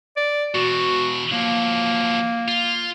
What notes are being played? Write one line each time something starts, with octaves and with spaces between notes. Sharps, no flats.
D5
B2 E3 F#4
F3 F#3 A#3
F4